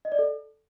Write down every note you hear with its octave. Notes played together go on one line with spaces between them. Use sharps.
D#5
D5
A4